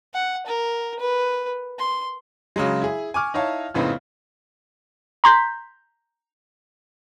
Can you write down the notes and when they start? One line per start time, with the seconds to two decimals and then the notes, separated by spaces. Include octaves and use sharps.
0.14 F#5
0.46 A#4
0.99 B4
1.79 C6
2.56 C#3 F#3 G#3
2.82 E4 G#4
3.14 G#5 C#6 D6 F6
3.34 D#4 E4 C#5 F5 A5
3.74 F2 A2 C#3 B3 C4 D#4
5.24 A#5 C6 G6 B6